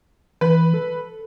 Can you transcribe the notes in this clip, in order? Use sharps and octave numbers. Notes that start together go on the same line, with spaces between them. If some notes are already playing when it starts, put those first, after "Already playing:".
E3 B4
A4